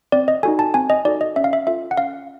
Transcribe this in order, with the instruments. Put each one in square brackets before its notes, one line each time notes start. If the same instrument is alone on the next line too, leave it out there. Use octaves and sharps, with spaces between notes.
[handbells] C4 D5
D#5
D#4 F#4 A4 G#5
A5
C4 G#5
D#5
D#4 F#4 A4 D5
D#5
C#4 E5
F5
E5
F4 A4 E5
F#5
C#4 F5